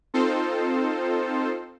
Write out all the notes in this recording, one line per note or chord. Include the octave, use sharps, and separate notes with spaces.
C4 D#4 F4 A4 C5